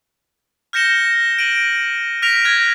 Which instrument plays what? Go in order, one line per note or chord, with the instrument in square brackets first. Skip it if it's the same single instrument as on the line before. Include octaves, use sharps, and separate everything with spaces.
[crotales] F6 G6 A#6 C#7 E7 G7
D7 D#7 F#7
F6 A#6 B6 D7 F7
F6 F#6 G#6 A#6 F7